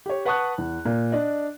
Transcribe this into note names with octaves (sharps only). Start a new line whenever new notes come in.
G4 C#5
B4 F#5 A5 C#6 D#6 F#6
E2
A#2
D4 D5 D#5